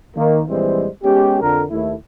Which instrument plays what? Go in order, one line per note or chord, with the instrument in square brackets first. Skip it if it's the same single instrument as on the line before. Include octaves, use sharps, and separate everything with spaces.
[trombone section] D#3 A#3
A#1 E3 G3 G#3 C4 C5
G#3 B3 C#4 G4
F2 D3 A#4
D#2 A3 E4